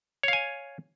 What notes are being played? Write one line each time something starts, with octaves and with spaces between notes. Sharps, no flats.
C#5 F5 G#5